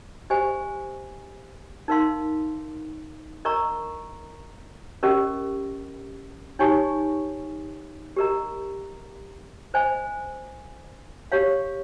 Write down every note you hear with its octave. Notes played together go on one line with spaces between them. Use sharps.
G4 C5 D#5 G#5
D#4 A#4 F5 C6
A#4 D#5 A#5 C#6
C#4 G4 A#4 D#5
D#4 G4 C#5 G#5 C#6
G4 A#4 D#5 A#5
C5 D#5 G#5
G4 C#5 F5